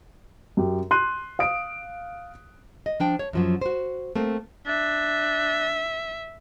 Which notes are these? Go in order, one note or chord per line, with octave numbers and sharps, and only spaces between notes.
F#2 G4
C6 F#6 D#7
F5 D#6 D7
D#5
F3 D4 G5
C#5
F#2 F3 F#3
F#4 C5
A3 A#3 C4
D4 E5